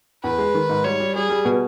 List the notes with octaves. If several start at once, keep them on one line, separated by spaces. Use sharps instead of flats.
E2 B4
G#3
D#3
G#2
G3 C#5
G3
G3 G#4
G3
B2